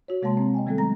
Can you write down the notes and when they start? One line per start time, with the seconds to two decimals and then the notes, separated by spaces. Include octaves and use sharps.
0.08 F#4 C#5
0.22 C3 G#3 A#3 C#5 A5 C6
0.37 C4
0.54 D#5 G5 G#5
0.66 D#3 G3 A3 B3 C4 A4
0.78 F#3 G#3 A#5 A#6